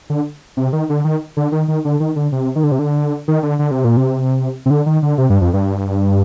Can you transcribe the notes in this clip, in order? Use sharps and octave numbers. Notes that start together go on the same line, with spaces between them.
D3
C3
D#3
D3
D#3
D3
D#3
D#3
D3
D#3
D3
C3
D#3
D3
C3
D3
D#3
D3
D3
C3
A#2
C3
C3
D3
D#3
D3
C3
G2
F2
G2